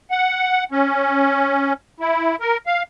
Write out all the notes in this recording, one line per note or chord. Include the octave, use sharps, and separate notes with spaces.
F#5
C#4
E4
A#4
F5